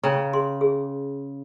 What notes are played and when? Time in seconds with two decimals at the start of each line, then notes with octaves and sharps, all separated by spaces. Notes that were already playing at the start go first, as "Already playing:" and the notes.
0.04 C#3 C#4 G5 A#5
0.33 G#4 C6
0.61 G#4